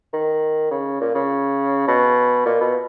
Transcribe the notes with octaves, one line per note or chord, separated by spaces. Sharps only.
D#3
C#3
A#2
C#3
B2
A#2
B2